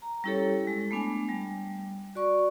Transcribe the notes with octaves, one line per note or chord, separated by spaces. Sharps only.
A#5
G3 C#4 E4 G4 A4 C#5
G#3
A3 B3 D4 G#5
G3
F#4 D5 C#6